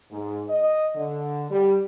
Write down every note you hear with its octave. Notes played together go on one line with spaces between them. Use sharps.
G#2
D#5
D3
G3